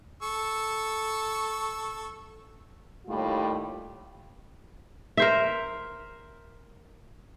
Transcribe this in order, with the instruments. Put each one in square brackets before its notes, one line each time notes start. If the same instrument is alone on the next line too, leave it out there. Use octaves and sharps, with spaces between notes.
[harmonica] A4 C#6 E6
[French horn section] D#2 A2 G3 F4
[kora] A#4 C5 E5